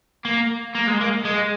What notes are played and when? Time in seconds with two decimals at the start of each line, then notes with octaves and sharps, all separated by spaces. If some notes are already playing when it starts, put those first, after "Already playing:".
0.25 A#3
0.75 A#3
0.87 G#3
1.00 A#3
1.24 G#3